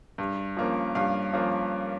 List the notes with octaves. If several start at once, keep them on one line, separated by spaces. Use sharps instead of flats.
G2
F3 A#3 C#4
G2 F5
F3 A#3 C#4